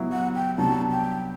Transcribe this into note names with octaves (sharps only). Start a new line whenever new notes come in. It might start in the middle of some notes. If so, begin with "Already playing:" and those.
Already playing: F#3 B3 E4
F#5
G5
C2 C3 F#3 B3 D4 A5
G5